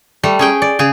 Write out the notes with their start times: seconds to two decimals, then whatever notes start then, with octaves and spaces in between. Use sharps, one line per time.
0.23 G3 A3
0.39 C#4 G#4 G5
0.62 D5
0.79 C#3 G#4